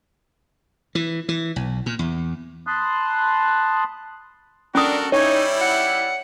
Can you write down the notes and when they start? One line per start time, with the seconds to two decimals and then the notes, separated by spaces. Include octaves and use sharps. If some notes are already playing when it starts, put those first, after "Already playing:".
0.95 E3
1.29 E3
1.56 B1
1.86 A#2
1.99 E2
2.67 A5 B5 C6 D#6 F#6
4.75 C#4 D4 F#4 A4 A#4 D#6
5.12 G3 D#4 E4 C#5
5.61 F#5